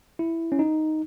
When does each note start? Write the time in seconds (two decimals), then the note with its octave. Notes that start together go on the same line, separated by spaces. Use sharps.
0.19 E4
0.52 C#4
0.59 D#4